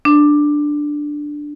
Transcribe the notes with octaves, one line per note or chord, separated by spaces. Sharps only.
D4